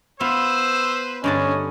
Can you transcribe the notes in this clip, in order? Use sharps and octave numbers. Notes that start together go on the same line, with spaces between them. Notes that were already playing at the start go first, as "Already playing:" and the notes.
B3 F4 B4 C5 E6
G2 D3 C#4 D#5 A5